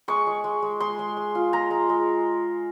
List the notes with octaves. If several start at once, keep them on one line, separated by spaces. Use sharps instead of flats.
G#3 C#6
G#3
G#3
G#3
G#3 C6
G#3
G#3
F4
G#3 A#5
G#3
G#3